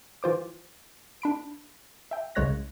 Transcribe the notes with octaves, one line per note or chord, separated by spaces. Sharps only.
E3 F4 C5 D6
D4 B5 D7
E5 G5
C2 C#3 G#3 C#5 F#6 A#6